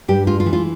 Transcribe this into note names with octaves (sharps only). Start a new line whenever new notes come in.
G2 G4
G#3 F4
F4
E3
F4